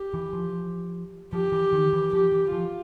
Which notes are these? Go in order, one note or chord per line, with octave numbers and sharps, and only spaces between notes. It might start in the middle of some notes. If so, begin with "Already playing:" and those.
Already playing: G4
E3
F3
F3 G4
E3
D#3
E3
F3 G4
E3
F3 F4